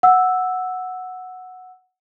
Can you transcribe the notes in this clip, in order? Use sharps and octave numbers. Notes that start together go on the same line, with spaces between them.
F#5 E6